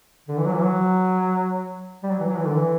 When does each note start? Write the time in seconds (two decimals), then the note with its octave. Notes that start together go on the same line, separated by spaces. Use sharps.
0.28 D3
0.37 E3
0.45 F#3
0.55 E3
0.62 F#3
2.03 G3
2.11 F#3
2.20 E3
2.29 F#3
2.38 E3
2.46 D3
2.55 E3